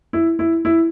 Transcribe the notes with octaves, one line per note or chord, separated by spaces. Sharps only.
E4
E4
E4